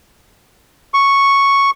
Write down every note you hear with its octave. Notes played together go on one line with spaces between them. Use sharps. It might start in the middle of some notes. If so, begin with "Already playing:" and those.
C#6